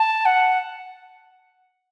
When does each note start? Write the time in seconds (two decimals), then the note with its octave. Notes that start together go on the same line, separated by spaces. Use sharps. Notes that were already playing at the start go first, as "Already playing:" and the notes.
Already playing: A5
0.25 F#5